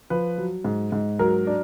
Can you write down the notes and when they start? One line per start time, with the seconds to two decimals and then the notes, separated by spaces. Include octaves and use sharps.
0.10 F3 B4
0.38 F#3
0.65 G#2
0.92 G#2
1.19 F#3 A#4
1.47 D4